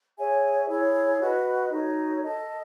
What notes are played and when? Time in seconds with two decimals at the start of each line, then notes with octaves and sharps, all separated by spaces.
0.18 G#4 C#5 E5 G#5
0.69 E4 G#4 C#5
1.20 F#4 B4 D#5
1.71 D#4 F#4 A4 C#5
2.23 A4 D#5 A5